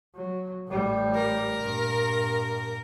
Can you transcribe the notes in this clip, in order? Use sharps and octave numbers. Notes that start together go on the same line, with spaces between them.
F#3
A1 G3
A#4
G2 A#2